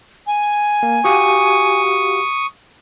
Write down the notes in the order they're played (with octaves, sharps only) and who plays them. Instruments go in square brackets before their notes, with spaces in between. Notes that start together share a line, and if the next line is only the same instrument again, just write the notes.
[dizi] G#5
[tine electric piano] A#3
[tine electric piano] F#4 G4 F5 [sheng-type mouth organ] C#6 D#6